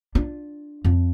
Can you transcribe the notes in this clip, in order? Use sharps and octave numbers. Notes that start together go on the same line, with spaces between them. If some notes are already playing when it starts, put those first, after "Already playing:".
D4 F4
F2